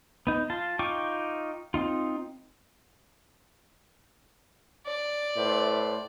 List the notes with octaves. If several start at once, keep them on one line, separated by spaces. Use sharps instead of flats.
B3 D#4
F4 A5
D#4 F4 G5 C#6 D6
C4 D#4 F4
D5
A2 E4 B4 C5